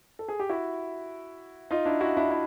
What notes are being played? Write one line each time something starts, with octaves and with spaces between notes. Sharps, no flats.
A4
G#4
G4
E4 F#4
D#4 F4
D4 E4
E4 F#4
D4 E4
E4